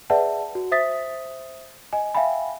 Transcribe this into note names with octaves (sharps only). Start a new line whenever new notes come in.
G#4 B4 D5 E5 F#5 A5
F#4
C5 E5 D#6 A6 B6
D#5 G#5
E5 F5 G5 G#5 B5